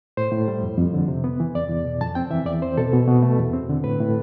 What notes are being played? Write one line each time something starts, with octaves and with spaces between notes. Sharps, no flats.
A2 C5
A2
G3
F2
F2
D3
C3
B3
E3
E2 D5
E2
B2
F2 A5
C4 G5
E3 E5
E2 D5
C4 C5
B2 A4
B2
B2
A3
E2
C4
D3
A2 B4
A2